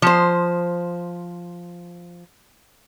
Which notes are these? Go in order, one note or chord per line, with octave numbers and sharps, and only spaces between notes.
F3 C5